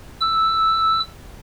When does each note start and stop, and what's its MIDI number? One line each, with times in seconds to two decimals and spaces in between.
0.21 1.00 88